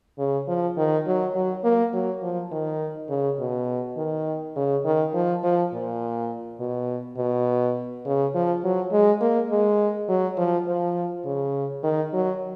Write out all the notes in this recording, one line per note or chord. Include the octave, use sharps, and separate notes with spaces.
C#3
F3
D#3
F#3
F#3
A#3
F#3
F3
D#3
C#3
B2
D#3
C#3
D#3
F3
F3
A#2
B2
B2
C#3
F3
F#3
G#3
A#3
G#3
F#3
F3
F3
C#3
D#3
F#3